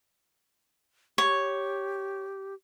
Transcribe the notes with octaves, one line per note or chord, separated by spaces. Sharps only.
G4 C#5